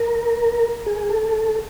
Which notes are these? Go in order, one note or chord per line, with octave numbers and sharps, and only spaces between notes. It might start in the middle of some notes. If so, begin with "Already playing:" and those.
Already playing: A#4
G#4
A4